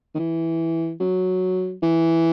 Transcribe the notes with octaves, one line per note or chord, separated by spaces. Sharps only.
D#3
E3
F#3
E3